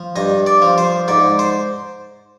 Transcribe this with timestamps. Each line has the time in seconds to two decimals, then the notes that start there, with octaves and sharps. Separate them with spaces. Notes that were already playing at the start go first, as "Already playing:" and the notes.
Already playing: F3
0.16 G2 D#5
0.47 D5
0.62 F3
0.78 C5
1.08 G#2 D5
1.39 C5